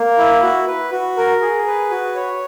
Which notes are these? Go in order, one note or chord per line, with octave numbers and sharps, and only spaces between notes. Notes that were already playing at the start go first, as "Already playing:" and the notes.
Already playing: A#3
E4
F#4
B4
F#4
A#4
G#4
B4
F#4
C#5